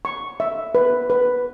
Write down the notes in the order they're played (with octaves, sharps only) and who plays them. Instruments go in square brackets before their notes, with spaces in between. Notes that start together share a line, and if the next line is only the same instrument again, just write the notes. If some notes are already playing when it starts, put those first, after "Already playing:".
[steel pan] C#6
E5
B4
B4